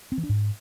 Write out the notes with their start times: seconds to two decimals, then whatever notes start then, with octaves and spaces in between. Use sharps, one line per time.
0.12 C4
0.18 E3
0.23 D4
0.29 G#2